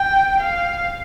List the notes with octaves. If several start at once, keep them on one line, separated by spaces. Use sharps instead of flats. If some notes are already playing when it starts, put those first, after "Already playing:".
Already playing: G5
F5